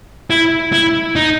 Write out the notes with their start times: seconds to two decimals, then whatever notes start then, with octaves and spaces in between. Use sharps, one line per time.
0.30 E4
0.73 E4
1.16 D#4